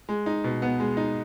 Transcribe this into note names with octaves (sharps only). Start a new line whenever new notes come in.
G#3
D#4
B2
B3
G#3
D#4